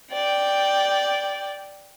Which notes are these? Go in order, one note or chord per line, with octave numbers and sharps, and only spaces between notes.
D5 G5